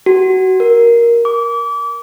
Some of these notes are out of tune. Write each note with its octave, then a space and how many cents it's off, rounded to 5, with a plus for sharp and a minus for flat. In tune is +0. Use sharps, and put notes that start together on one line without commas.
F#4 +25
A#4 +10
D6 -30